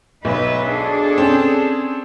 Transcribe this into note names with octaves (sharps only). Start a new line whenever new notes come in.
B1 D#4 B4 E5
D4 G#4 A4
C4 C#4